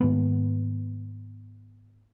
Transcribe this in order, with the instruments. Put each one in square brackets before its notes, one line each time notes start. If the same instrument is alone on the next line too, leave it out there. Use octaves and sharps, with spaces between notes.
[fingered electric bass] G#2 D#3 A#3 B3